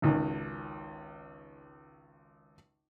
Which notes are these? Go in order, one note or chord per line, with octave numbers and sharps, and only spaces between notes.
G#1 C#2 D#3